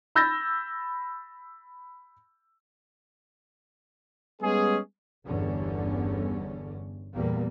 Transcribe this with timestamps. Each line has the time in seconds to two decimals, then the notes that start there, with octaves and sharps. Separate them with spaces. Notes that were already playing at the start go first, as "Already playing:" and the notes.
0.16 B5 E6 G6 A6 A#6
4.42 G3 G#3 B3 C#4 G#4
5.26 G1 E2 G2 D3 C#4
7.13 E2 A#2 G3 A#3